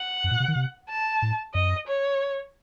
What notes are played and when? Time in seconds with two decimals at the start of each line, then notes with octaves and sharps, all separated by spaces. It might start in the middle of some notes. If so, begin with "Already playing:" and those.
Already playing: F#5
0.24 F#2
0.31 A#2
0.40 C3
0.48 D#3
0.56 C3
0.89 A5
1.22 A2
1.54 F#2 D#5
1.87 C#5